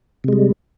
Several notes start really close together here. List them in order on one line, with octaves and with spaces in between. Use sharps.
C3 G#3 G3